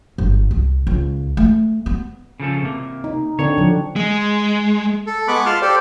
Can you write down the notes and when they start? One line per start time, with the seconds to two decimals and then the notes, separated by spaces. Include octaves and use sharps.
0.18 G1
0.51 C2
0.87 C#2
1.37 A3
1.86 B3
2.40 C#3 F3 A4
2.62 C3 A#3
3.04 D#4
3.39 D3 C4 D4 C#5
3.58 D3 F3 F#3
3.96 G#3
5.07 A4
5.28 G#3 B3 B5 C#6 D6 F#6
5.46 F4 A5 C6 F6
5.62 G4 A4 C5 D5